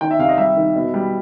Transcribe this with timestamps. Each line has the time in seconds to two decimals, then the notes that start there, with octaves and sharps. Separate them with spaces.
0.01 D#3 G5
0.11 E5
0.19 C3 F5
0.29 D#5
0.38 G3 E5
0.57 D#3
0.75 B2
0.94 G3